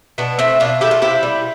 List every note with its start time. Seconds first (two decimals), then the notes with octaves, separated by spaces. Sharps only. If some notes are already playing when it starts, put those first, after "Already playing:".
0.18 B2 B3 D4
0.39 A3 C4 E4
0.60 B2 D4 F4
0.81 A3 E4 G4
0.91 F4 A4
1.02 C3 E4 G4
1.23 G3